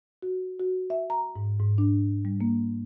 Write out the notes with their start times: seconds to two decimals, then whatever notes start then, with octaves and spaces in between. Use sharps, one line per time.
0.23 F#4
0.60 F#4
0.90 E5
1.10 A#5
1.36 G#2
1.59 G#2
1.78 D4
2.25 G3
2.41 A#3